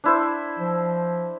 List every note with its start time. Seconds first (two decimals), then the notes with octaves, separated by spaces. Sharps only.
0.04 D4 E4 C5
0.59 F3